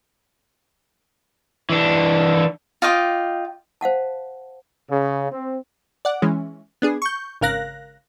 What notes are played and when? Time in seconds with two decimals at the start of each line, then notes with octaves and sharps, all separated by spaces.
1.70 E3 D4
2.82 F4 D#5 G5 D6
3.81 C5 F5 F#5 A5
4.90 C#3
5.32 C4
6.05 D5 F#5
6.22 E3 G#3 C#4
6.82 B3 D4 G#4
7.02 C#6 G6
7.41 G#1 C#3 A#4 F5 F#6 A#6